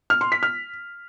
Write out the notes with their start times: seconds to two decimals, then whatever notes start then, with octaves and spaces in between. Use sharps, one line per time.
0.10 F6
0.21 C6
0.32 B6
0.43 F6